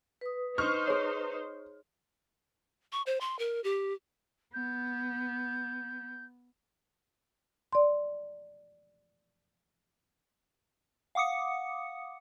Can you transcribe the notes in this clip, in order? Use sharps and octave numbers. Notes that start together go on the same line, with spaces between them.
B4 D#6
D#4 C5 C#6 F6
G#4 C#5
C#6
C5
C6
A#4
G4
B3 G6
D5 C6
F5 F#5 D6 D#6 C#7